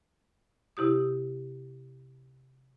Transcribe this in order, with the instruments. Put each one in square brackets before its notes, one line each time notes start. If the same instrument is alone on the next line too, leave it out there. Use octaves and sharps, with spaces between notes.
[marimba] C3 E4 G4 D#6